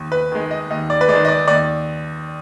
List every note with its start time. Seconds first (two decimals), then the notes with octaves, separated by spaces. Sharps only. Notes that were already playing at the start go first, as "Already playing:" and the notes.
Already playing: D#2
0.12 B4
0.32 D#3 G#3
0.51 D#5
0.70 D#2 D#5
0.90 D5
1.01 B4
1.08 G#3 D5
1.13 D#3
1.25 D#5
1.28 D5
1.48 D#2 D5